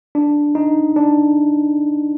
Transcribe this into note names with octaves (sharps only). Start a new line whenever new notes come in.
D4
D#4
D4